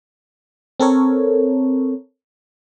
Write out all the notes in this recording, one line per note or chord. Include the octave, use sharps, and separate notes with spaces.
C4 A4 A#4 C#5